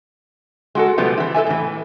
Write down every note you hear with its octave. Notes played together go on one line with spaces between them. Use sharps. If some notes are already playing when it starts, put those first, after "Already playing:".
G#3 F#4 A4
B2 F3 G3 A3 B3
E3 E4
A4 B4 E5 G#5
A2 E3